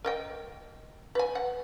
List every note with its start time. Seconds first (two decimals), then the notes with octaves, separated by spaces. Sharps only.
0.05 A#4 D#5 G5
1.15 B4 G#5
1.35 F#5